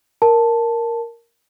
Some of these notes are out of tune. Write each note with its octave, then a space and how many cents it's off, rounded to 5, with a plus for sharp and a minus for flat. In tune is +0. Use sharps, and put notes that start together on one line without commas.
A#4 +0 A5 +0